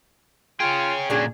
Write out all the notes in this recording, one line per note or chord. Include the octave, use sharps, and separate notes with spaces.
F4 G#4 C#5 G5
A#2 D3 C#4 D4 F#4 G#4